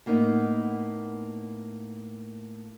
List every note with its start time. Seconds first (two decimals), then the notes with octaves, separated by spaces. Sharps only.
0.06 A2 A#3 B3 D#4